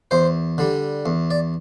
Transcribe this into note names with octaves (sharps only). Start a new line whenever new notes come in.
E2 C5
D3 G3
E2
D5